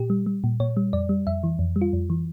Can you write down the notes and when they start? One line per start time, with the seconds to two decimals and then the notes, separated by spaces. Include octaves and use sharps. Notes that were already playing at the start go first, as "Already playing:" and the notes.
Already playing: A#2 G4
0.10 G3
0.26 G3
0.44 A#2
0.60 A#2 C#5
0.77 G3
0.93 F2 D5
1.09 G3
1.27 F2 E5
1.43 E3
1.59 F2
1.76 G3
1.81 F4
1.93 F2
2.10 E3